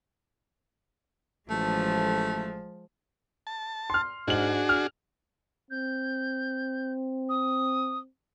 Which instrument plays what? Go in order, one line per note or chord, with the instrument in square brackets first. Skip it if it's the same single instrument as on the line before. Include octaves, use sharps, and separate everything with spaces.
[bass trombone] A1 [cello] F3 G#3 [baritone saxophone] A3
[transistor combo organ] A5
[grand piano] C6 F6
[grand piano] G#2 F#7 [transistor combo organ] D4 F#4 G#4
[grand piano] F6
[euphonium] C4 [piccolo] G6
[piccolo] D#6